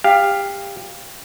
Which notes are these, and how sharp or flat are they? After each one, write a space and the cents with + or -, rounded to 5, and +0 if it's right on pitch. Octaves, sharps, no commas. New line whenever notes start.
G4 +25 F5 +0